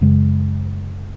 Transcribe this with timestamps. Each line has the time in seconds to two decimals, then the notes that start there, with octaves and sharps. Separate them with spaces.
0.01 F#2 C#3 G#3